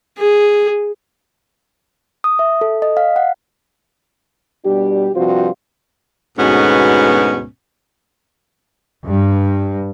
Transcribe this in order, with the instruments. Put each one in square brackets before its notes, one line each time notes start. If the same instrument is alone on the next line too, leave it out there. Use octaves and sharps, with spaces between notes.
[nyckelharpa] G#4
[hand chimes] D#6
E5
A4
D#5
F5
F#5
[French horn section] B2 G3 D4 G4
G2 C3 F3 F4 F#4 C5
[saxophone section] D2 G#2 B2 B3 C#4
[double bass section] G2